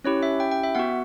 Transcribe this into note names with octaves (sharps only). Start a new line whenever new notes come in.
C#4 E4 G4 C#5
E5
G5
G5
E5
B3 F#4 F#5